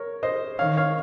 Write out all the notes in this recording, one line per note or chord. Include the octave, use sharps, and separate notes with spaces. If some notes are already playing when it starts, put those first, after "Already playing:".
Already playing: A#4 C#5
C5 D#5
D#3 C#5 F5
C#5 F5